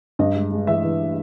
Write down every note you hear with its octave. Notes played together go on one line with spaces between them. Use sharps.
G2 D#5
G#3
G#3
E3 E5
E3